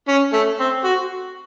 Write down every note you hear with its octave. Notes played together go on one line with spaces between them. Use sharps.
C#4
A3
C4
F#4